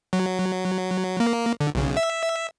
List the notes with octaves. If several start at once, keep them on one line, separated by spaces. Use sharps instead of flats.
F#3
A#3
D3
B1 C#3
E5